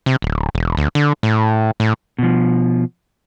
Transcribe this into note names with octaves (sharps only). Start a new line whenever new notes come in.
C3
D1
E1
D2
D3
A2
A2
B2 F3